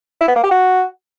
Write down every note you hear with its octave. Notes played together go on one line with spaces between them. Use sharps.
E4
B3
A#3
G4
F#4